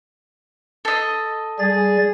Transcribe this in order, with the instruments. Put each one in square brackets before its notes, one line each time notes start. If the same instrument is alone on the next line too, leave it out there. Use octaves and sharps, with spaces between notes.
[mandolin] A4 D#5
[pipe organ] G3 A6 [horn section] G#4